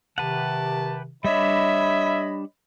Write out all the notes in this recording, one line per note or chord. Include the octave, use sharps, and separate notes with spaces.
C3 D#3 G4 B4 F#5 A5
G3 D4 C#5 D#5 E5 B5